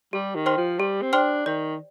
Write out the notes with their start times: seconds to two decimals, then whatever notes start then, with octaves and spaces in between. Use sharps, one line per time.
0.13 G3 G4
0.35 D#3
0.46 C5 G5 C6 F6
0.58 F3
0.79 G3 G4
1.02 C4
1.13 D4 C5 G5 C6 F6
1.46 D#3 D5